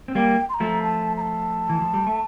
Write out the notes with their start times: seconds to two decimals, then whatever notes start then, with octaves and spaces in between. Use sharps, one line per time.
0.08 C4
0.15 G3 A#3 G5
0.49 C6
0.54 A#5
0.60 F3 A3
0.83 A5
1.17 A#5
1.21 A5
1.69 E3
1.82 F3
1.94 G3
2.07 A3